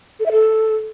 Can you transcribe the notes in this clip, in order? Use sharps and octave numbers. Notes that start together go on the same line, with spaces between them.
A4
E5
A4